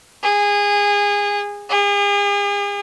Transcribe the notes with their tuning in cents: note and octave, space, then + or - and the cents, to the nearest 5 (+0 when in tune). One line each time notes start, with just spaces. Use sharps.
G#4 -25
G#4 -40